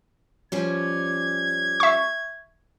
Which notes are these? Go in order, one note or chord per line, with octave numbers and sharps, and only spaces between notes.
F3 G3 C#4 G#6
E5 C#6